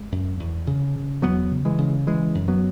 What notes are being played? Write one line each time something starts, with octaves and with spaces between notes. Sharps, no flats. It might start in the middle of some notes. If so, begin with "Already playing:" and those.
Already playing: G#3
F#2
E2
C#3
C#3
E2 F#3 B3
C#3
E3 G#3
C#3
C#3 E3 G#3
F#2
F#3 B3